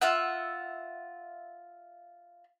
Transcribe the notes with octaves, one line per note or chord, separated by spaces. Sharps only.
F4 E5 F#5